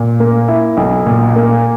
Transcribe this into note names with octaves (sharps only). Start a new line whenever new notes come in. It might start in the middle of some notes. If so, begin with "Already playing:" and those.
Already playing: A#2
A#3
E4
B1
A#2
A#3